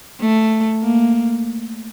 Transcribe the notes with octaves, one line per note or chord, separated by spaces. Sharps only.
A3
A#3